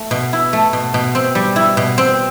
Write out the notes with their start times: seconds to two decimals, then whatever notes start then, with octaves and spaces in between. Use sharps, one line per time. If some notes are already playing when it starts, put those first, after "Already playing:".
Already playing: A3
0.11 B2
0.33 E4
0.53 A3
0.73 B2
0.94 B2
1.15 C4
1.35 G3
1.56 E4
1.77 B2
1.98 C4